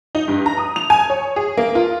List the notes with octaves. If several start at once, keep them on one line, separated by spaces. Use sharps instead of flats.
D#4
G2
A#5
D#6
F7
G#5
C#5
G#4
A#3
F4